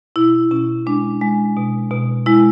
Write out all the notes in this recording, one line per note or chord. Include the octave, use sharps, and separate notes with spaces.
B2 E4
B2 C#4
G#3 D4
G#3
B2
B2
G#3 E4